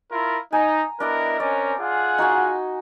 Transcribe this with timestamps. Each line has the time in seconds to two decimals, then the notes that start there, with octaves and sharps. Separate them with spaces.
0.11 E4 F4 A#4
0.52 D#4 G#5 A#5
1.00 B3 D4 E4 A#4 D#5 D6
1.40 C4 C#4 A#4 D5
1.79 F4 G#4 F#5
2.18 D#4 F#4 G#5